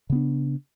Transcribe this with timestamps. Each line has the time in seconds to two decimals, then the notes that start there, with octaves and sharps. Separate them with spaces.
0.10 C#3
0.12 B3
0.15 D4